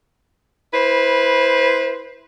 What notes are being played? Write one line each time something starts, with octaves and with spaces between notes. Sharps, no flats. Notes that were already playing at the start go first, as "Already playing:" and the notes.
E4 B4 C5